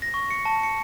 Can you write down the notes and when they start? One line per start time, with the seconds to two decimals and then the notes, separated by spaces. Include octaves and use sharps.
0.02 A#6
0.14 C#6
0.30 C#7
0.45 A5
0.63 C#7